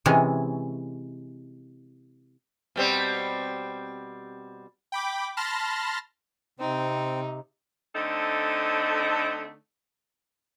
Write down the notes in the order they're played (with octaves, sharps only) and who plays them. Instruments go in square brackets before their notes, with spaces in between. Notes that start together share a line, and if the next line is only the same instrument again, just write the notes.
[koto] C3 E3 G#3 C#4
[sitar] B2 G3 C4
[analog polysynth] G5 B5 D6
A5 B5 C6 F6 A#6
[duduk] C3 [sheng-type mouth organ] C4 [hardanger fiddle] D#4
[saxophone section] D3 A3 C4 D#4 A4